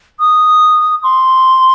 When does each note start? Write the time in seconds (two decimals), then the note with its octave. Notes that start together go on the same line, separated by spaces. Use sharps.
0.20 D#6
1.03 C6